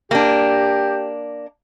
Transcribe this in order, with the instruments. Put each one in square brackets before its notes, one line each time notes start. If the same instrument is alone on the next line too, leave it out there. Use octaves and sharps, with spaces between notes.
[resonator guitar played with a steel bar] A#3 D4 [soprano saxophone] G4